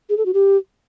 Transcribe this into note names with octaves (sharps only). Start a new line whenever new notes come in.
G#4
A4
F#4
G4